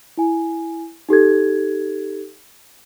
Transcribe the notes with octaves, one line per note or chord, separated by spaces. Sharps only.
E4 G#5
D#4 G4 A4 G#6